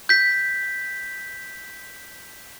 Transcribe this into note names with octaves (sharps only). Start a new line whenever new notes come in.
G6 B6